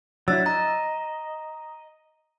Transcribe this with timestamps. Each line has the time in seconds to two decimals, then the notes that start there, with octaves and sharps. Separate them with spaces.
0.28 F#3 D4 E4 E6 A6
0.46 D#5 A#5